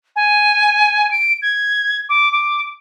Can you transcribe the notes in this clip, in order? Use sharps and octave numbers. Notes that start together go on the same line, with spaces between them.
G#5
D7
G#6
D6
D6